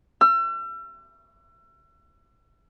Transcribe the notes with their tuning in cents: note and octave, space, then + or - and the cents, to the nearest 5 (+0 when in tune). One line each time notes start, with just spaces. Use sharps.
E6 +40